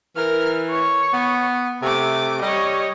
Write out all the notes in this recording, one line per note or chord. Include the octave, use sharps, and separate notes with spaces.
E3 A#4 F6
C#5 C#6
B3
C3 A3 D6
G3 C#5 D#5